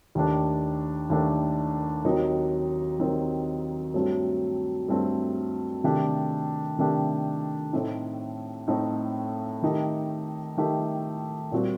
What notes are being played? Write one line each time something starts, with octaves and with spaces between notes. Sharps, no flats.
D#2 D#3 A3 D4
D#2 D#3 A3 D4
D#2 D#3 F#3 C4 D#4
D#2 D#3 F#3 C4 D#4
G2 F#3 A3 C4
G2 F#3 A3 C4
C3 D#3 A3 D4 G4
C3 D#3 A3 D4 G4
A2 A3 C4 D#4
A2 A3 C4 D#4
D#3 A3 D#4 G4
D#3 A3 D#4 G4
A#2 G3 C4 F#4